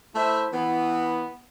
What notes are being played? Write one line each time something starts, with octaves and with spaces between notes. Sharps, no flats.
A3 E4 C5 E5
E3 B3